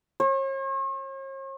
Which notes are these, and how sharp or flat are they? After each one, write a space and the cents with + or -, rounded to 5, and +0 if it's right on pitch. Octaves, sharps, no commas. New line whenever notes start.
C#5 -45